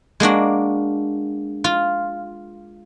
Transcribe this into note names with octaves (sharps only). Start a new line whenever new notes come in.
G#3 A#3 D4 F#4
F4